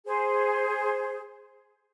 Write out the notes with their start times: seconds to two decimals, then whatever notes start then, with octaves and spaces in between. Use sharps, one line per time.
0.06 G#4 C5